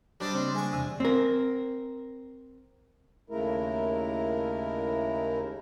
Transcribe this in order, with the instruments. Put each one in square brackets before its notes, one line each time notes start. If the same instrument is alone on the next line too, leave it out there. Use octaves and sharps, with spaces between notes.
[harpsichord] G3 C5 D#5 [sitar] D4
[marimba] C#3 A#3 [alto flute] C4
[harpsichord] G#3 C#6 [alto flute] G#5
[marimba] E2 C3 E3
[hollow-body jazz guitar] C4 A#4
[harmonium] D#2 C#3 G#3 A3 E4 A#4